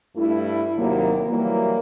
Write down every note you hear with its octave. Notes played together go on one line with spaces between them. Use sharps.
G2 A3 E4
D#2 C3 F#3 A#3
E3 F#3 G3 A#3